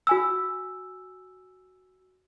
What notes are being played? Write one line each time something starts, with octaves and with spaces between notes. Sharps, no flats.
F#4 G#5 E6